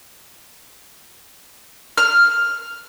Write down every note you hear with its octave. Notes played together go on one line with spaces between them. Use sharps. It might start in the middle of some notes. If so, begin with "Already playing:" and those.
F6